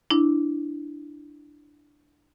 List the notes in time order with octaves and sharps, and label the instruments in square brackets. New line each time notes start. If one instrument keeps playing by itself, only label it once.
[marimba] D4 E4